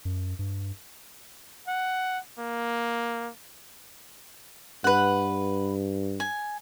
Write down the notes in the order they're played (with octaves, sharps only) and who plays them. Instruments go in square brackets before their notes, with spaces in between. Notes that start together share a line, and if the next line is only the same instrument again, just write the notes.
[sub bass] F#2
G2
[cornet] F#5
A#3
[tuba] G2 [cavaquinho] B4 F#5
[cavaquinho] G#5